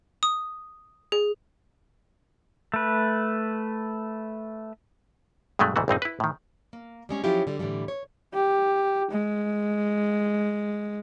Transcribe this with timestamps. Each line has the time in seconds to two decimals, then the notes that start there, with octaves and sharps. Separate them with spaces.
0.23 D#6
1.12 G#4
2.74 A3 B4
5.59 G2 B2 F#3 G#3 A3
5.76 D2 G#2 E3 A3 F#4
5.88 A#1 G2 C4 D#4
6.02 E4 B4
6.20 A2 D#3
6.73 A#3
7.09 G3 G#3 C#4
7.24 F3 F#3 C#4 E4 F4 G4
7.47 D3 G3
7.59 A2 D3 E3 F3 G3
7.88 C#5
8.34 G4
9.11 G#3